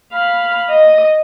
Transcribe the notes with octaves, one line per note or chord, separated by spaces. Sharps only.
F5 B5
D#5